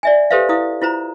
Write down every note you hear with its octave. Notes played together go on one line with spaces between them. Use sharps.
D5 E5 G#5
G4 A4 B4 C5 E5 F5
E4 F5 D#6
E4 F4 C5 A#5